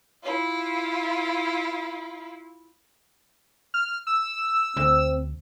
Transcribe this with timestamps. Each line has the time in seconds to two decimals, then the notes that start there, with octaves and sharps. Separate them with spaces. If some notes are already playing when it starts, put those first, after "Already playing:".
0.24 E4 F4
3.74 F6
4.07 E6
4.77 D2 C4